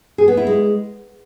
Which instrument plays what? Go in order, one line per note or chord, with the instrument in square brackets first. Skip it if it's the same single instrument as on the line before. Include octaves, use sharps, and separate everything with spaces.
[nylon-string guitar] G#4
B3
E4
G#3